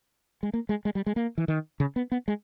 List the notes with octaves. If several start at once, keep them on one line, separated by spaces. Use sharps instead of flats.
G#3
A#3
G#3
G#3
G3
G#3
A#3
E3
D#3
C#3
B3
B3
G#3